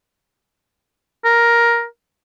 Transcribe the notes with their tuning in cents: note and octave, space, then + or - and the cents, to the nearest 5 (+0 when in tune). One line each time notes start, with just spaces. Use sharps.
A#4 +10